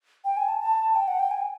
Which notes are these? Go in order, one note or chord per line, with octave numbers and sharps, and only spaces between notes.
G5
G#5
A5
A5
G5
F#5
G5
G#5